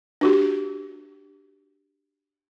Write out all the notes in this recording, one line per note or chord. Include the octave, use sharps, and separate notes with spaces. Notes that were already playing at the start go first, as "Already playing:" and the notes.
D4 F#4 G4